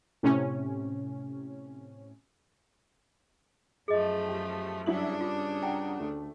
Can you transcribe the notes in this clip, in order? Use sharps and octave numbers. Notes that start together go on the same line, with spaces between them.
A2 C3 C#4
F#2 F3 A3 G#4 D#5
G4
G2 C#3 F#3 D4 E4 F#7
F4 D6
F#5 G5 A#5
D2 A3